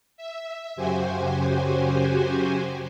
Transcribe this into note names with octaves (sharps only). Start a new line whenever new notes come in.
E5
F#2 C#3 F#4 G4 C5 G#5